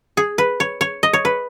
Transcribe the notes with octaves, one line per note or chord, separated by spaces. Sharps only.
G#4
B4
C#5
C#5
D#5
C#5
B4